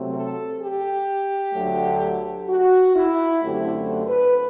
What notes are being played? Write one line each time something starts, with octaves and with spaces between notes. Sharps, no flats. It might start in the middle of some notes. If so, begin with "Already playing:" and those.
Already playing: C3 F#3 A3 C4
A4
G4
D2 D3 F#3 A3
F#4
E4
F#2 D3 A3 C4 G4
B4